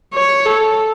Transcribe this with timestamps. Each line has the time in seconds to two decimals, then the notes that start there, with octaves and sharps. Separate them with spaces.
0.15 C#5
0.46 A4